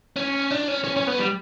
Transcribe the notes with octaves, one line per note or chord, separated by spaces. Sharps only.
C#4
D4
C#4
C#4
C#4
B3
G3